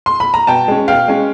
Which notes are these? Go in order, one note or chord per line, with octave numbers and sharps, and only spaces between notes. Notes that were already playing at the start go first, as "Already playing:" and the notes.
C6
B5
A#5
B2 G5 A5
G#3 C#4
B2 F5 G5
G#3 C#4